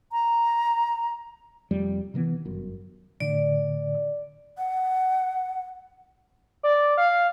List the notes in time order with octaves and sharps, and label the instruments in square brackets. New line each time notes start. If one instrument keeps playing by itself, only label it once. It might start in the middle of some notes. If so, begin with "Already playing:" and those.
[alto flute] A#5
[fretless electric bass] F1 F2 G3
C3 D#3 E3 B3
G1 F#2
[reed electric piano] A2 D3 [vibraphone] D5
[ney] F#5
[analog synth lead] D5
F5